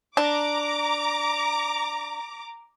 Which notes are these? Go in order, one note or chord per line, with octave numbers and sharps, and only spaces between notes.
D4 A#5 D6